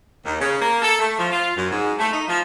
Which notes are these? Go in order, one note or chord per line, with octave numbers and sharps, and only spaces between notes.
D#2
C#3
A#3
A4
A3
F3
F4
F#2
G#2
A3
D#4
F3